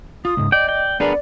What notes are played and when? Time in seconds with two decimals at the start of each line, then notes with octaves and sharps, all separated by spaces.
0.25 F4 D#6
0.37 C#2 G#2
0.52 D5 D#5 G5
0.69 G5
1.00 B3 D4 G#4 A#4 B4 D5